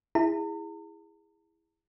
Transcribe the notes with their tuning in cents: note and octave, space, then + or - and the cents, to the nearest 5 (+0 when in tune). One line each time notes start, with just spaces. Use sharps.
E4 +0 G#4 -20 A#5 -45